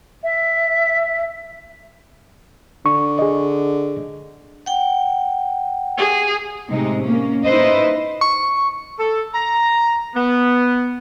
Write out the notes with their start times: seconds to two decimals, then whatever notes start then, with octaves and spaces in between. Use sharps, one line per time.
0.23 E5
2.86 D3 C#6
3.19 G#4 D#5
4.66 F#5 G5
5.97 G#4
6.70 A2 C3 G#3 D#4
7.01 A#3 C#4
7.44 D#4 E4 B4 C5 D#5
8.21 C#6
8.98 A4
9.32 A#5
10.14 B3